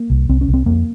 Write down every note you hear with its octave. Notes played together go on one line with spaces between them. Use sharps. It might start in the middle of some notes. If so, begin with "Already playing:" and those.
Already playing: A#3
C2
C2 C4
C#4
C2
C4
F2 A#3